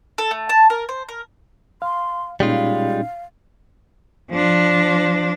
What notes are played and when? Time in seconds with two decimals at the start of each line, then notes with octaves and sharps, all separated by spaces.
0.18 A4
0.31 A3
0.49 A5
0.70 A#4
0.89 C5
1.09 A#4
1.82 F5 C6
2.40 A#2 G3 G#3 C#4 D#4 F4 F5
4.31 F3 D4